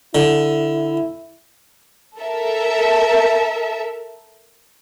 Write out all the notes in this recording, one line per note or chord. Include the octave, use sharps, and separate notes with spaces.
D3 E4
A4 A#4 E5